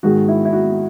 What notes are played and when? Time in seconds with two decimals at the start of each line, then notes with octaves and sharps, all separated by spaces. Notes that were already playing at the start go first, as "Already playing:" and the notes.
0.03 G#2 D#3 G#3 F#4
0.28 E4
0.45 E4
0.53 F#4